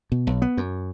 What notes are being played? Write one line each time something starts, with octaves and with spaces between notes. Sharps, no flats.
B2
B1
B3
F#2